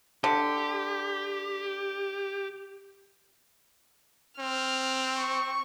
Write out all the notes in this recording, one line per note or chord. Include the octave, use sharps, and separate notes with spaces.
D3 G4
C4 F6
C#6